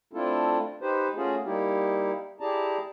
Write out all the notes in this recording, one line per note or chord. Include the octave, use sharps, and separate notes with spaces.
A3 C4 D4 E4 F4 A4
D#4 G4 B4 C5
A3 C#4 F4 F#4 G#4
G3 A#3 D#4 E4 G4
E4 G4 G#4 D5 A5 A#5